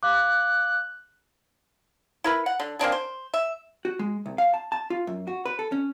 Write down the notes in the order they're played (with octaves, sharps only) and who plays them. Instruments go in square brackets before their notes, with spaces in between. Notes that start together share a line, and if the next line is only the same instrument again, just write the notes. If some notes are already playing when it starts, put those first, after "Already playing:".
[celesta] F5 D6 [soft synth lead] F#6
[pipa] E4 A#4 B4
F#5
D3
A#3 C4 D4 G#4
C5
E5
[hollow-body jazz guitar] F#4
G#3
C2
F5
A5
A5
F4
F#2
F#4
B4
A4
C#4